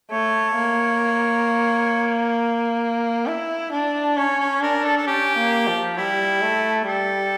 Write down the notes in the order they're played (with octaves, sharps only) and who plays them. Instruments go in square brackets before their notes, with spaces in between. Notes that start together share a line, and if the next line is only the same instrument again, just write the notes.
[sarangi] A3 [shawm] C#5
[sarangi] A#3
E4
D4
[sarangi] C#4 [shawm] C#5
[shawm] C#5
[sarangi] D4 [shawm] A#4
[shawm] A4
A4
[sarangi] C#4 [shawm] G4
[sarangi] A#3
F3
[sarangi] G3 [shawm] E4
[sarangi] A3
[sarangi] G3 [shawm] A4